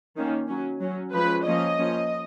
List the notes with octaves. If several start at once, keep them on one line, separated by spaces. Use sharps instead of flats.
D#3 A#3 C#4
F#3 C#4
F#3 C#4
F3 G#3 C#4 B4
F3 A#3 C#4 D#5
F3 A#3 C#4